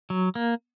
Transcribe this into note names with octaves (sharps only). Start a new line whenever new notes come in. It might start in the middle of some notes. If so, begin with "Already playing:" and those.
F#3
A#3